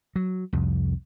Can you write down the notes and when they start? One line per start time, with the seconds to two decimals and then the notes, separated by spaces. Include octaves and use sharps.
0.16 F#3
0.53 C2 F2